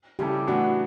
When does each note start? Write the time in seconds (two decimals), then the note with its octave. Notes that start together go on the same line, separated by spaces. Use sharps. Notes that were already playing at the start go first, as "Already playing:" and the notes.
0.19 C#3 G3 C#4 E4 G4 A4
0.47 A2 E3 B3 D4 F#4